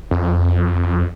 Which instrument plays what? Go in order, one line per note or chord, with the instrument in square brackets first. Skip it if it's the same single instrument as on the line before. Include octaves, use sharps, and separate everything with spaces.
[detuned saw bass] F2